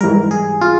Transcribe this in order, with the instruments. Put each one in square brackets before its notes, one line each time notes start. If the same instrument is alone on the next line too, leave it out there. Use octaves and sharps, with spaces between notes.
[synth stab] G#2 E3 G3 [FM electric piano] A#4
[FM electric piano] G#4
F4